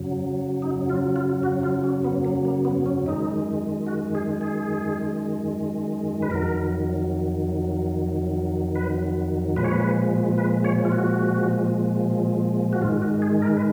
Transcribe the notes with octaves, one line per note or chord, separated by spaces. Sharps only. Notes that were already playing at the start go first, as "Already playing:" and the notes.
Already playing: F#2 C#3 F#3
D#4
F4
F4
F#4
F4
C#4
B3
A#3
A#3
B3
C#4
F#2 D#3 G#3 D#4
F#4
G#4
G#4
B4
F2 D#3 F#3 A#4
B4
A#2 F3 G#3 B4
C#5
B4
B4
C#5
F4
F#4
F#4
G#2 D#3 G#3 F4
F#4
G#4
A#4
B4